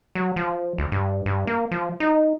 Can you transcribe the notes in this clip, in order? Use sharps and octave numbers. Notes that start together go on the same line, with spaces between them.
F#3
F3
D2
G2
G2
A#3
F3
D#4